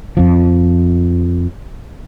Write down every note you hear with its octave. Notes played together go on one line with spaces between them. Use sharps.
F2 F3